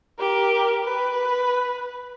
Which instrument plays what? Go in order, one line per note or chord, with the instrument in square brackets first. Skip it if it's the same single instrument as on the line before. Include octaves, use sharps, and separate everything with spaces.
[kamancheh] G4 A#4
B4